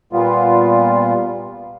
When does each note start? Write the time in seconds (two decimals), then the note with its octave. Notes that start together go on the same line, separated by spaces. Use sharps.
0.13 A#2 G3 B3 F4